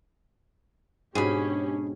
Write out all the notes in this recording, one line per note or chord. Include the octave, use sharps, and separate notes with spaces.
G#2 B2 C#4 D4 G4 G#4 B5